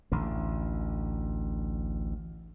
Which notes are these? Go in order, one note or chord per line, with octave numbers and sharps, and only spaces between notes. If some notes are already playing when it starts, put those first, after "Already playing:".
A1 D2 D3